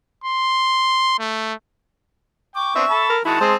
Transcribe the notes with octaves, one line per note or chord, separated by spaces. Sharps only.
C6
A3
G5 C#6 D6
B3 C4 D4 E5
A4 A5 B5
A#4
D#3 G#3 E4 F#4 A5
G#3 C4 G#4 C5